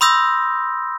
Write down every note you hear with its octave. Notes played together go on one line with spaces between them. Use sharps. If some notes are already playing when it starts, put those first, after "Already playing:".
B5 C6 D#6 E6 G6 A#6